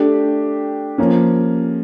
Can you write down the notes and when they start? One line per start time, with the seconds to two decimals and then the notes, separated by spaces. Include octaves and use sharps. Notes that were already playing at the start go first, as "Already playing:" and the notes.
Already playing: A3 D4 G4
0.98 F3 A#3 C#4